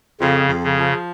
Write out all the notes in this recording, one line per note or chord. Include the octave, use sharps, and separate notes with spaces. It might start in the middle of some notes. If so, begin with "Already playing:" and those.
F2 C#3
F2
C#3
F3